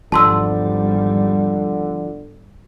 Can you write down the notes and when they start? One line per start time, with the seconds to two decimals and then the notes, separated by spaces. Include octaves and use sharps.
0.12 G#1 E2 D3 F3 G3 A5 C6 E6